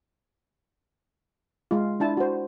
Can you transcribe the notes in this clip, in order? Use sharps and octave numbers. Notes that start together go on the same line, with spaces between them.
G#3 F4
D4 E4 A5
F#4 C5